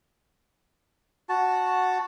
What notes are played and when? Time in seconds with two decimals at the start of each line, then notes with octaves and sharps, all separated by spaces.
1.29 F#4 A5